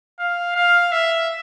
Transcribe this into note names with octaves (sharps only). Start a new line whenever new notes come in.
F5
F5
E5